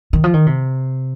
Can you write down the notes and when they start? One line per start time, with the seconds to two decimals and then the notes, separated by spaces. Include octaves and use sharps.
0.13 D#3
0.24 F3
0.34 D#3
0.46 C3